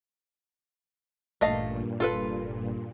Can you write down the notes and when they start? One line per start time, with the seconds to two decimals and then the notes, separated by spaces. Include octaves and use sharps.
1.41 A1 G2 A#2 A3 D#5 F5
2.00 F1 F4 A4 B4